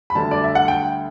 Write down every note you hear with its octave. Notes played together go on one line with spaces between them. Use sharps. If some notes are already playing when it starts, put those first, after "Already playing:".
B5
D2 D3 G3 A5
D5
E5
F#5
G5